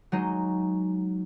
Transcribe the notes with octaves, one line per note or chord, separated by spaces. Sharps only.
F#3 G#3 D#4